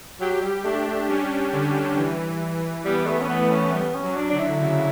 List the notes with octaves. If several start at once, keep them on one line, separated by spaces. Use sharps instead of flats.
F#3 G4
G3
A3 D4
A3
G3 C#4
D3
E3
G3 B3
A3
C#4
A3 B3
C#4
G3 B3
C#4
F#3
D4
D3 D4
E4
C#3